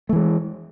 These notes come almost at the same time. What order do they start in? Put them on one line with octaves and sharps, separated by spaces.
A3 E3 G#3